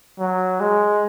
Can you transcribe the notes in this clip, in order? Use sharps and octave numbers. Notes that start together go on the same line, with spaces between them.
F#3
G#3